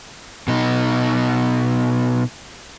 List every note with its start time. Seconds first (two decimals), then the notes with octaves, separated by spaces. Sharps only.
0.48 B2 D#4